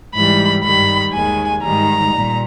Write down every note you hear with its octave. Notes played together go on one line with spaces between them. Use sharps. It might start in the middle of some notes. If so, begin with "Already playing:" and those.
G#2 E3 G3 B5
G2 D#3 G3 B5
D#2 D#3 G#3 G#5
G#2 D#3 G3 A#5
A#2 G3